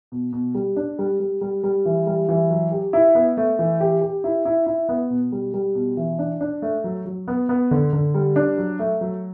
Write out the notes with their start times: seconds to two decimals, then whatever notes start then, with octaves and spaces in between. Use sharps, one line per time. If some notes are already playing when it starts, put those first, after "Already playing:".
0.12 B2
0.33 B2
0.54 G3
0.76 D4
0.99 G3
1.20 G3
1.41 G3
1.63 G3
1.86 E3
2.07 G3
2.29 E3
2.51 F#3
2.72 G4
2.93 E4
3.15 B3
3.37 A3
3.59 E3
3.80 G4
4.01 G4
4.24 E4
4.45 E4
4.66 E4
4.89 B3
5.10 B2
5.32 G3
5.54 G3
5.75 B2
5.97 E3
6.19 D4
6.41 D4
6.62 A3
6.84 F#3
7.06 F#3
7.28 B3
7.49 B3
7.71 D3
7.93 D3
8.14 G3
8.36 D4
8.58 F#3
8.79 A3
9.01 F#3